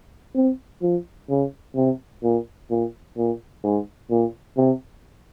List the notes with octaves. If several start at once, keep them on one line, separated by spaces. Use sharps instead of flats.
C4
F3
C#3
C3
A#2
A#2
A#2
G#2
A#2
C3